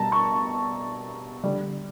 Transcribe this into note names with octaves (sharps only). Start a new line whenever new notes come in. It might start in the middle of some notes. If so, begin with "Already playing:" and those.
Already playing: B2 G3 A5 A#5
C#6
D3 G3